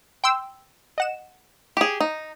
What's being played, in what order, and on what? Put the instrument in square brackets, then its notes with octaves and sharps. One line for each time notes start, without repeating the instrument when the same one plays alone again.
[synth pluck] G5 C6 E6
D#5 F#5 E7
[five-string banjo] G4 G#4
D#4